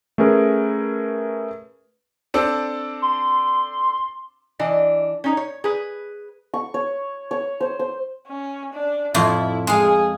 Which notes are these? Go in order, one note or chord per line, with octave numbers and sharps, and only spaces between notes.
A3 C#4 G#4 A#4 B4
C4 D4 A4
C6
E3 D4 D#5
C#4 D#4 C#5
C#5
G#4 B4
C#6
C#5
C#5
C5
C5
C#4
D4
F2 A2 E4 F4
G#3 G#4 F5